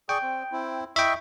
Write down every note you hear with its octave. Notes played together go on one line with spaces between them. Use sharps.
G#4 D5 G5 C#6
C4
C4 E4
E4 D#5 E5 G5 C#6